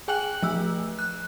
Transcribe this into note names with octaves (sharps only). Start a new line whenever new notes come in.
G#4 G5 G#5 F#6 F#7
F3 A3 E6
F#6